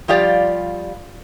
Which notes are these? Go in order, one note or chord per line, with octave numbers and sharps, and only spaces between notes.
F3 G3 F4 G4 D5